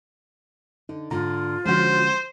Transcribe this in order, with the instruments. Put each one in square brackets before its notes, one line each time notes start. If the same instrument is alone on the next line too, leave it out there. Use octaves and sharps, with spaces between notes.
[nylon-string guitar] D3 [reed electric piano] D#4
[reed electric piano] G#2 A#5 [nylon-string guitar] D3 [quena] F4
[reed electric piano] D3 G#3 [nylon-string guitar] F3 C#4 F#4 [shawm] C5